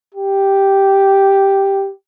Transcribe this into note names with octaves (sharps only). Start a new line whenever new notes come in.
G4